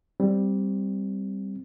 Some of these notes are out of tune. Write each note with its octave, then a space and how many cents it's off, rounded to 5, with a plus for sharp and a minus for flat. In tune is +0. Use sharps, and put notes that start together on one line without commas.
G3 +0 C4 +0